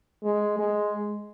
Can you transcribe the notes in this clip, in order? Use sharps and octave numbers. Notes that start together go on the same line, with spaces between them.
G#3
G#3